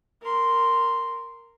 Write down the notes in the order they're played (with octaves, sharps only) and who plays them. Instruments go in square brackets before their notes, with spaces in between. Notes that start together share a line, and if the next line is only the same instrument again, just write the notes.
[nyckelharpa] A#4 C6